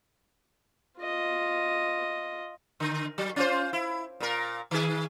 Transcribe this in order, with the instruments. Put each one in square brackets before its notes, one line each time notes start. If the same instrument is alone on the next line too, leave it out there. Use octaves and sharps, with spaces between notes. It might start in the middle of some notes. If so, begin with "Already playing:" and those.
[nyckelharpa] F4 D#5
[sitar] D3
F#3
C#4 F4 C5
E4
A#2 A#4
D#3 G#4